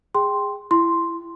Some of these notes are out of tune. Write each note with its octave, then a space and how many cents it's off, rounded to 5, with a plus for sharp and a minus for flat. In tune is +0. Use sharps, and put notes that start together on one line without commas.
G#4 -20 G5 +0 C6 +0
E4 +20 C6 +0